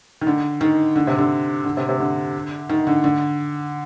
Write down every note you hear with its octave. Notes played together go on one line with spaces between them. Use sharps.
D#3
D3
D#3
D3
C3
D3
D3
C3
C3
D3
D#3
D3
D3